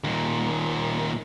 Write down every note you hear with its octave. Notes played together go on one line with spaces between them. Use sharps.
D#2 A#2